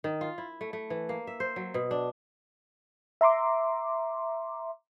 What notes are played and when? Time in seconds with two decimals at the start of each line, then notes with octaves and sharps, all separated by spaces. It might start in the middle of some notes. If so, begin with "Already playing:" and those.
0.04 D#3
0.21 F4
0.38 E4
0.61 A3
0.73 A3
0.90 E3
1.09 A#3
1.27 E5
1.40 C5
1.56 F#3
1.74 B2
1.91 D4
3.21 E5 A#5 C6 D6